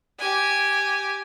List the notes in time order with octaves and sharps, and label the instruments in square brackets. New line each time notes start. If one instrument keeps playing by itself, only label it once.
[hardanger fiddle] G4 G#5